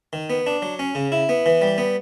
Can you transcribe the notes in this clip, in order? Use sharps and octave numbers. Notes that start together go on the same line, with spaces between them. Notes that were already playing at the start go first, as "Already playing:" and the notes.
D#3
B3
D4
F#3
C#4
C#3
E4
B3
E3
G3
B3